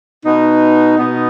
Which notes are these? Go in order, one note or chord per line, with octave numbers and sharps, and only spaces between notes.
B2 B3 D#4
B2 B3 D#4